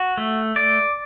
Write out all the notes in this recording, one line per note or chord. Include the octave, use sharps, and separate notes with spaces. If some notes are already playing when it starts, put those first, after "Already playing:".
Already playing: F#4
A3
D5